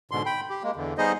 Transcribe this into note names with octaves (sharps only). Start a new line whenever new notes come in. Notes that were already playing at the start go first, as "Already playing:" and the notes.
G#2 B2 D3 C6
G5 B5
G4
G#3 A#3
E2 D3
G3 B3 D#4 G#4 C5 D#5